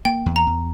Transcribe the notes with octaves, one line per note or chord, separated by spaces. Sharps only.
A#3 G5
E2
A#5
E2